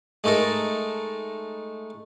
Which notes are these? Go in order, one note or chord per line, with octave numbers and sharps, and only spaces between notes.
G#3 A3 D#4 A4 A#4